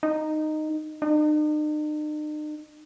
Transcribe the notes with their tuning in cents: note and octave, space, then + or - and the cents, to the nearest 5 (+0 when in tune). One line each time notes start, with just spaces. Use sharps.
D#4 -10
D#4 -45